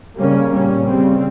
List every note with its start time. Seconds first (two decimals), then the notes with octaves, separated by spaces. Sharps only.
0.17 C#3 G3 A#3 C#4
0.52 A#2 G3 C#4
0.87 C#3 G3 C4